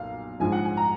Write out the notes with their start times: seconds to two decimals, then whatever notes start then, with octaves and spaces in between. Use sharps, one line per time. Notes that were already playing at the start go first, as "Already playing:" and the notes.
Already playing: B1 A#2 F5
0.40 A#1 G#2 F3 G#5
0.52 F#5
0.65 G#5
0.77 A#5